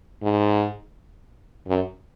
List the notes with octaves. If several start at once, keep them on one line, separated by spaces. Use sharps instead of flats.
G#2
F#2